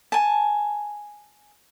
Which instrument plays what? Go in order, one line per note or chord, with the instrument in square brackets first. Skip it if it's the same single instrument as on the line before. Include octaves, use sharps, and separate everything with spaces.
[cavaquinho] G#5 A5